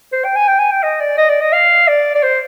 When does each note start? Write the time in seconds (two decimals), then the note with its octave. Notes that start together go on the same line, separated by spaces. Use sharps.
0.13 C5
0.24 G5
0.36 G#5
0.48 G5
0.59 G#5
0.71 G5
0.83 D#5
1.00 D5
1.18 D#5
1.30 D5
1.41 D#5
1.53 F5
1.88 D5
2.15 D5
2.23 C5